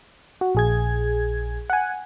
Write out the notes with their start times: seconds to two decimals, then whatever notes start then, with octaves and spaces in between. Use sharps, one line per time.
0.41 F#4
0.55 A#1 G#4 G#6
1.70 F#5 G#5